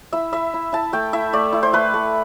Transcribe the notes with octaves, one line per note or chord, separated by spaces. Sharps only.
E4 E5
E4 E5
E4
E4 A5
A3 G5
E4 E5
A3 D5
E4
C5
A3 B4
A3